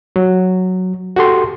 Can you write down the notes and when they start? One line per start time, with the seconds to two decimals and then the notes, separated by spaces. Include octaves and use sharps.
0.16 F#3
1.16 F#4 G4 A4 C6